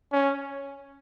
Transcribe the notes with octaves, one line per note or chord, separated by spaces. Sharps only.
C#4